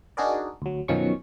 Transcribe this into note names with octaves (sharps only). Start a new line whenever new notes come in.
D4 D#4 F#4 G#4 A#4 D5
D2 F#3
F#2 B2 D#3 F3 C#4 C#6